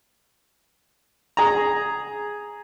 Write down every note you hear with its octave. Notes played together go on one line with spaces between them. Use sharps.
G#4 A#5